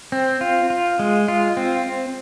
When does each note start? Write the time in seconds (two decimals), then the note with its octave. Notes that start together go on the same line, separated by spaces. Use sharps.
0.12 C4
0.41 F4
0.70 F4
0.99 G#3
1.28 F4
1.57 C4